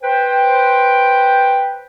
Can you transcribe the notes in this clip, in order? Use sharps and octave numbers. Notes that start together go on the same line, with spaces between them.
B4 C5 G5